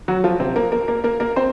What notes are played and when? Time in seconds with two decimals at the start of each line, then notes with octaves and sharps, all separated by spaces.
0.08 F#3 F#4
0.24 F3 F4
0.40 C3 C4
0.56 A#3 A#4
0.72 A#3 A#4
0.88 A#3 A#4
1.04 A#3 A#4
1.20 A#3 A#4
1.36 C4 C5